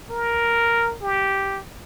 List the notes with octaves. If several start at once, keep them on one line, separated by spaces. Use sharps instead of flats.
A#4
G4